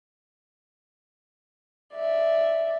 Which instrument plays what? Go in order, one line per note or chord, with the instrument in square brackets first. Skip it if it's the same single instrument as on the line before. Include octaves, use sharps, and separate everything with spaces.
[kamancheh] D5 E5